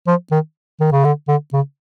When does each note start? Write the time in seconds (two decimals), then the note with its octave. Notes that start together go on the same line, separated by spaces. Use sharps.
0.07 F3
0.31 D#3
0.80 D#3
0.92 C#3
1.04 D3
1.28 D3
1.53 C#3